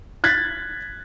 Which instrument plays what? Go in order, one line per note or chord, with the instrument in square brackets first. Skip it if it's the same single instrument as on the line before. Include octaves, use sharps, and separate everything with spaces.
[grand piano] F#6 G#6 A6 B6